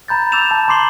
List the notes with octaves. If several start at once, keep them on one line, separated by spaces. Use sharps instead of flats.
A#5 B5 G6 A6
D6 E6 G6 A6 E7 F7
A5
A#5 C6 D6 C7 F#7 G7